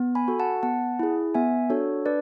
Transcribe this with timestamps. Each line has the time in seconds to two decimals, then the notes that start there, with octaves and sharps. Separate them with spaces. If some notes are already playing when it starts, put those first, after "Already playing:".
Already playing: B3
0.15 G#5 B5
0.28 F#4 A4
0.39 F#5 A5
0.63 B3 F#5 A5
0.99 E4 G#4
1.35 B3 E5 G#5
1.70 D4 F#4 A4 C#5
2.06 D4 B4 D5